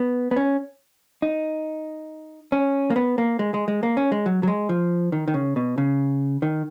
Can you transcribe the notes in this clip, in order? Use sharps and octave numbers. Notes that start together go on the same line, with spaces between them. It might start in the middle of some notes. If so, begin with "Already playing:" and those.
Already playing: B3
B3
C#4
D#4
C#4
A#3
B3
A#3
G#3
G#3
G#3
A#3
C#4
G#3
F#3
F#3
G#3
F3
D#3
D#3
C#3
B2
C#3
D#3